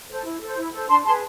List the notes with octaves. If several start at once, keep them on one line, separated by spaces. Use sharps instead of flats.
A4 C5
E4
A4 C5
E4
A4 C5
D4 A5 C6
G#4 B4 A5 C6